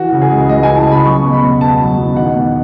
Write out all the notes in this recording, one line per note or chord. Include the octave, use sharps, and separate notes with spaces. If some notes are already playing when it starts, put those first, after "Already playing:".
Already playing: E3 F#4
C#3
G#4
C#2
C#2 D#5
E3 G#5
A5
C#3
B5
F#3 C#6
B2
B5
E2
B3 A5
F#3
B2
D#3 F#5
E2